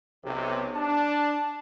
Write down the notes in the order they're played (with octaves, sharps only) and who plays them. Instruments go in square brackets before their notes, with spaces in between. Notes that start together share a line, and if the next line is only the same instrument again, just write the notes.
[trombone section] B1 C3
[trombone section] D4 [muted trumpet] A5